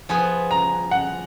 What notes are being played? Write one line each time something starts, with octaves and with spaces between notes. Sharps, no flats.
F3 B3 F4 G#4 B4 G#5
A#5
F#5